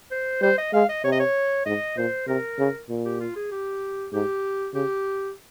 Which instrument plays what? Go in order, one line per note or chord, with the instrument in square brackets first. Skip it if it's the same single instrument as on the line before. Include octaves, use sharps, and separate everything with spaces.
[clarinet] C5
[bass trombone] G3 [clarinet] C5
[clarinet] D#5
[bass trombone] G#3 [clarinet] F5
[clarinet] D#5
[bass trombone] C3 [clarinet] C#5
[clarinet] D#5
C#5
[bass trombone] G#2 [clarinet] D#5
[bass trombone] A#2 [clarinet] C5
[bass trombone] C3 [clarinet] A#4
[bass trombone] C#3
A#2
[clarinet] G4
F4
G#4
G4
[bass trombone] G#2 [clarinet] G4
[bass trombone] C#3 [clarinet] G4